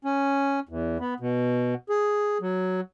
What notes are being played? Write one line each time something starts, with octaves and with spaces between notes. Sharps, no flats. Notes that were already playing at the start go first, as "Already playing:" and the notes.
C#4
E2
B3
B2
G#4
F#3